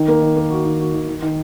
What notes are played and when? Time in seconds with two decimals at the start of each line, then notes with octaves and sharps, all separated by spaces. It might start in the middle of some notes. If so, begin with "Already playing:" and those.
Already playing: D#3
0.08 A#3
0.22 D#3
0.36 A#3
0.51 F#4
0.65 D#3
0.80 F#4
0.93 D#3
1.08 D#3
1.22 D#3